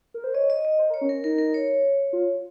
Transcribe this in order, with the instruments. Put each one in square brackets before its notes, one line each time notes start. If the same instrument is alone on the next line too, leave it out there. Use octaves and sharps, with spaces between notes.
[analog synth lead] A#4
C5
[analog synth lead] C#5 [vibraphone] D#5
[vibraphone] D#5
D#5
[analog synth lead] C5
A#4
[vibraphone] C#5
[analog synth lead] C#4
[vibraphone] A#4
[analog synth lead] D#4 [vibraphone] A#4
[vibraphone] A#4
C#5
[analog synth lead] F4